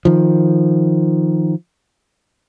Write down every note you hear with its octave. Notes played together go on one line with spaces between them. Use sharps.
D#3 F3